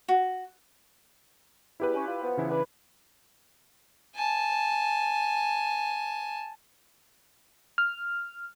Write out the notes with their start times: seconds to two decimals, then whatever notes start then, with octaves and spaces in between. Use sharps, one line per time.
0.08 F#4
1.80 E2 E4 G4 B4
1.94 C#4
2.06 G3 F4
2.22 F3 B3
2.37 C#3 E3 E4
2.49 D4 B4
4.15 G#5 A5
7.78 F6